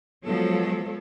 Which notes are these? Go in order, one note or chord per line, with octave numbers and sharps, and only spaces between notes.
F3 F#3 G#3 B3 A4 C#5